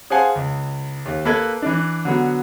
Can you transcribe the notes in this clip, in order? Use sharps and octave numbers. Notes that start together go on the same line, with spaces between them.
G#4 C5 F5 F#5 G#5 A5
C#2
D#2
A#3 A4 B4 F#6 G#6
E3 D4
D3 F#3 B3